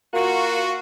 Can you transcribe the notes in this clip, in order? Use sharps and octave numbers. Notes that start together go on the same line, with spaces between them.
A#3 F4 F#4